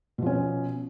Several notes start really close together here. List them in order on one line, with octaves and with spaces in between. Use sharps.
B2 F3 C#4